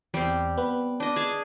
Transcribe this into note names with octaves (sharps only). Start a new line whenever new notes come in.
E2 G3 C4
B3 B4
D4 D#5
G#4 A5